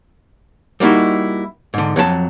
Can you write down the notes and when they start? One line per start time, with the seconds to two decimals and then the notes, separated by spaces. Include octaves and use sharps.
0.80 G3 A#3 D#4 E4 F#4
1.74 G#2 D3
1.96 F2 F#3 A4 A5